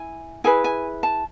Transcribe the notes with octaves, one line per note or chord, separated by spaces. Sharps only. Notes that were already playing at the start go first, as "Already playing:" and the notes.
Already playing: E4 G#5
E4 G#4 B4 G#5
G#5
A5